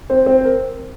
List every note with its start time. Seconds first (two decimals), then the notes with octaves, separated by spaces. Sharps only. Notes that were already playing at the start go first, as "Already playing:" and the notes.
0.10 C4 C5
0.26 C4 C5
0.45 A#4